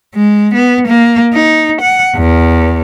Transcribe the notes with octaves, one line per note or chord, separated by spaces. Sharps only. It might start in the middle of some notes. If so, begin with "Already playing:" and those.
G#3
B3
A#3
D#4
F#5
E2